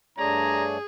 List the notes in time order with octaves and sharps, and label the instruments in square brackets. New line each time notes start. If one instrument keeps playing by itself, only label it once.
[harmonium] G2 D4 [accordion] A3 C#5 D5 [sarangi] G#4 [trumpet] A#5